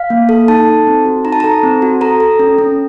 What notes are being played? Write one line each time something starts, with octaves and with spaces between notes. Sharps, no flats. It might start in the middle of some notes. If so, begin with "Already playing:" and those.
Already playing: F5
A#3
A4
D#4 A5
A4
C4
F#4
D#4 A#5
A5
A4 A#5
C4
F#4
A4 A#5
A4
C#4
C#4